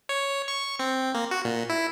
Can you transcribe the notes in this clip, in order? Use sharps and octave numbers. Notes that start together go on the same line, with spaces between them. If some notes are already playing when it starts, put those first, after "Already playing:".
C#5
C#6
C4
A#3
F#4
A#2
E4